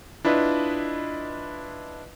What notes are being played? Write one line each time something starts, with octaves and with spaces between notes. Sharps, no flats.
D4 E4 F4 B4 D#5